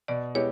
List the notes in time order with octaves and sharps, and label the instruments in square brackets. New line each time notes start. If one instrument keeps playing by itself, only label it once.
[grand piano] B2 [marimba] D5
[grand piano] G#3 B3 E4 G4 [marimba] C#5